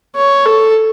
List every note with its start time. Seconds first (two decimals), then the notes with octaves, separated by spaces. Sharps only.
0.16 C#5
0.46 A4